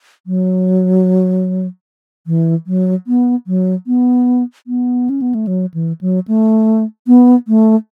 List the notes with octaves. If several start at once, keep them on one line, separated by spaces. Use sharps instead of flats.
F#3
E3
F#3
B3
F#3
B3
B3
C#4
B3
A3
F#3
E3
F#3
A3
B3
A3